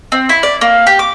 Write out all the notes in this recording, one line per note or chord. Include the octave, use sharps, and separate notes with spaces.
C4
E4
D5
A#3
G4
D6